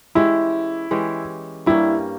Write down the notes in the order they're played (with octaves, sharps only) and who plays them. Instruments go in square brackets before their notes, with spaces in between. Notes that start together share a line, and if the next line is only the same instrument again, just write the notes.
[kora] E3 G#3 C#4 G4 [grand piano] E4
[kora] E3 G#3 C#4 G4
[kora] G2 G3 A#3 C#4 [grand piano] E4